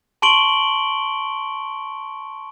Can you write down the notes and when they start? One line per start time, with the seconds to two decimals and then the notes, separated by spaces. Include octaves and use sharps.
0.22 A5 C6 C#6 D7 F#7 G7